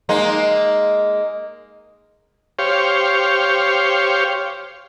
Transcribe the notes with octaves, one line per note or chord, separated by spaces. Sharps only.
G#3 A#3 D#4
G4 C5 C#5 F5